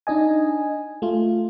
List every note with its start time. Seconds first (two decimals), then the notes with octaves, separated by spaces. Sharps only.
0.07 D4 D#4 D#5 G#5
1.02 A3 F4